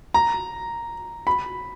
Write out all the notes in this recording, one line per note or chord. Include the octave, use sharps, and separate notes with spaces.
A#5
B5